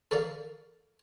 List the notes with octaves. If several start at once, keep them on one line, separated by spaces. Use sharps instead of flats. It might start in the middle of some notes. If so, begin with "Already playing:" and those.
A4 A#4 D5 F5